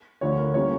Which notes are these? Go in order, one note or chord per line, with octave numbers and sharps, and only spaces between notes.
D2 D3 F3 C#5
A#4
E3 G3 A#3 C#4 C#5